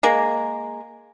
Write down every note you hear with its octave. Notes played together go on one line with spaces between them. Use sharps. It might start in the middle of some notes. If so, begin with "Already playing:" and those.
G#3 A#3